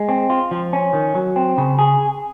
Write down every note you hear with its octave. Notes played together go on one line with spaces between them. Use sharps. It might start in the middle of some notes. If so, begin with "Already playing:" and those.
Already playing: G#3
C4
F4
F3
C#4
D#3
F#3
C4
C#3
G#4